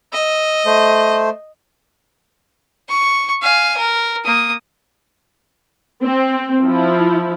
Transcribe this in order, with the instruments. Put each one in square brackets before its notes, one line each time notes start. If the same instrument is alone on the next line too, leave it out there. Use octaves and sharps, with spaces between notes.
[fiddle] D#5 [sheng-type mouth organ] E6
[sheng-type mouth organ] A3 C5
[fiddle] C#6
F5 G#5
A#4
A#3 D#6
[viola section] C4
F3 E4